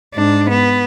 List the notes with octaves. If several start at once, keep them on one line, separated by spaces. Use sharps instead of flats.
G#2 D4
B3